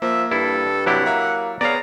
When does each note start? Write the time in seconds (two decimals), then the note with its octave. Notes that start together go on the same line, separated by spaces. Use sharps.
0.02 F3 A#3 E5
0.32 G2 E4 A4
0.86 C3 F#3 E4 G4 F#5 D6 A6
1.06 A#3 E5 A#5
1.61 B3 G#4 C#5 D5 F5 A#5